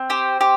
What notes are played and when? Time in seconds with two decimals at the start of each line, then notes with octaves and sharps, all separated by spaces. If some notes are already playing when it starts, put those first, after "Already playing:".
Already playing: C4
0.10 G4 C5
0.41 G4